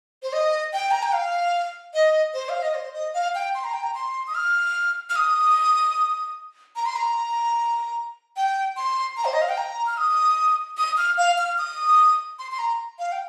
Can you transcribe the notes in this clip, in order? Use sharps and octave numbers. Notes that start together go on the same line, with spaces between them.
C5
D#5
G5
A#5
G5
F5
D#5
C5
F5
D#5
C5
D#5
F5
G5
C6
A#5
G5
A#5
C6
D#6
F6
F6
D#6
A#5
C6
A#5
G5
C6
A#5
C5
D#5
F5
G5
A#5
F6
D#6
D#6
F6
F5
F6
D#6
C6
C6
A#5
F5
G5